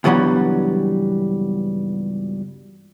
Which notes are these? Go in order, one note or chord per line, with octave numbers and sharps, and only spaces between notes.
C#2 G2 E3 F#3 G3 B3